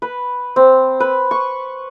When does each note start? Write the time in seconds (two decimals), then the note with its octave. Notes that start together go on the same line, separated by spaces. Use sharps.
0.02 B4
0.56 C4
1.00 B4
1.31 C#6